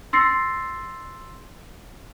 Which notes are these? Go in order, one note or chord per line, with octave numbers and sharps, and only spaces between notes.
C6 E6 A6 A#6 C7 C#7